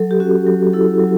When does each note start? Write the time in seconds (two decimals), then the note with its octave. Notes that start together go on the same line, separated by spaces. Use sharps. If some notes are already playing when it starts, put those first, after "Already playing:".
Already playing: F#3 A4
0.11 G4
0.20 C#4 F#4
0.47 F#3 G4
0.73 E4 A4
1.00 F#3